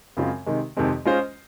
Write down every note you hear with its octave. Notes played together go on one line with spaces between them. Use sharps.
F#2 C#3 G#3 C4 F4
C3 D#3 G#3
F2 C3 D#3 G#3 C4
G#3 C#4 F4 C5 D#5